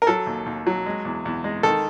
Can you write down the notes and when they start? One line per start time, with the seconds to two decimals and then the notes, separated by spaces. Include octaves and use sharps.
0.02 A#4
0.07 F#3 A4
0.27 D#2
0.46 D#2
0.67 F#3
0.86 G#3
1.05 E2
1.25 E2
1.44 G#3
1.63 D#3 A4